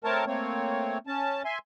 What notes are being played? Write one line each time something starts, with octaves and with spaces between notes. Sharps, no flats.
A3 C4 A#4 C#5 A5
A3 A#3 C4 C#5
C#4 A5
E5 G#5 C6